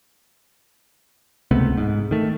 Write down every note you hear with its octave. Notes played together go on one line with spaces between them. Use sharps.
C#2 C3 A3 B3
G#2
D#3 A3